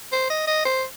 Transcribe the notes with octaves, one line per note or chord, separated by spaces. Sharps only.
C5
D#5
D#5
C5